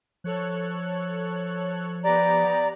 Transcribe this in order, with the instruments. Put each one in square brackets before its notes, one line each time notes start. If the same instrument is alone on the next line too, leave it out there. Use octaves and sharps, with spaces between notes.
[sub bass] F3 [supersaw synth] A4 C#5 F#6
[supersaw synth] B3 G4 [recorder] D5 [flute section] A#5